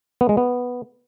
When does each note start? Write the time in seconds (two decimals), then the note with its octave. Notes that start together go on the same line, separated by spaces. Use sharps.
0.21 B3
0.29 G#3
0.37 B3